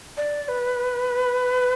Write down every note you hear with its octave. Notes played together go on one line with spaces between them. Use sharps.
D5
B4